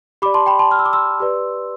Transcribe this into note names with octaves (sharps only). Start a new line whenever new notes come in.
G4 D5 B5 D6
A5 C6
G5 B5
A5 C6
F6
E6
D6
C6 E6
G4 B4 D5